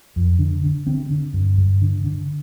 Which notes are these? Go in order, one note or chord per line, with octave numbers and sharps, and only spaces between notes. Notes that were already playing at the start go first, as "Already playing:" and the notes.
F2
D3
D3
D3 C4
D3
G2
G2
D3
D3